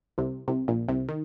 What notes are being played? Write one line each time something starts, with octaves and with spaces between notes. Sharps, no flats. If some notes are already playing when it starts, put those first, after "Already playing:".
C2 C3
C2 C3
A#1 A#2
C2 C3
D#3